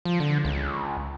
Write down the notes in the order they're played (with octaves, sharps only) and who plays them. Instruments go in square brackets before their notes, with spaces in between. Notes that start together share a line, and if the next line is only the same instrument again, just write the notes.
[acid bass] F3
D3
C#2